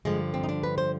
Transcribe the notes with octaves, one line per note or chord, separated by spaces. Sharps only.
G2 D3 F3 G#3
C4
D#4
D4
B4
C5